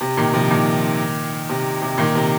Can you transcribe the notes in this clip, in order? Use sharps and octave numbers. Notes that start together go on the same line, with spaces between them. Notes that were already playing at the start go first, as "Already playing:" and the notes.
C3
A#2 D#3
C3 F3
A#2 D#3
C3
C3
A#2 D#3
C3